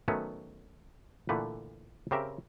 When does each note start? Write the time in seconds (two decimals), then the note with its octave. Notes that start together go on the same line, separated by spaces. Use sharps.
0.08 D#3 F#3 A3 B3 C#4
1.29 A#2 D3 E3 A3 B4
2.11 C#3 C4 G4 A#4 E5